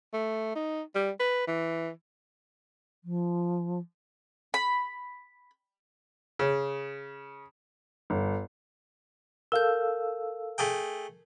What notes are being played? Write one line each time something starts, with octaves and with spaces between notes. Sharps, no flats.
A3
D#4
G3
B4
E3
F3
B5
C#3
G1
A4 A#4 F5 E6 G6
A3 G#4 G5